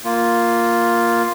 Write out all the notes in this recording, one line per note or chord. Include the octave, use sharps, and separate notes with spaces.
A#3 F4